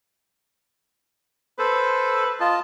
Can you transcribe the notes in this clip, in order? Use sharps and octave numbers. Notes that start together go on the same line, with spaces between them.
A4 B4 C5
F4 D#5 A5